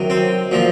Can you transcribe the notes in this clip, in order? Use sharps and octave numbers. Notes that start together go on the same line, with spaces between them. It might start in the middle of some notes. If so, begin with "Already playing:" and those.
Already playing: C3 D#3 F#3
C4
A#2 F3